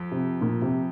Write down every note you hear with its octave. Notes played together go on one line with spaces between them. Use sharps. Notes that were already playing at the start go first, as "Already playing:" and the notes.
Already playing: F2
C3
A#2
C3